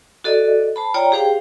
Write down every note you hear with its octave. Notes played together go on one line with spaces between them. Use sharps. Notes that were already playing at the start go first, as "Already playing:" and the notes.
F#4 A4 D5 D#5
C5 A5 B5
F4 C#5 D5 G5 A#5
G4 G#4 C5 F5 G5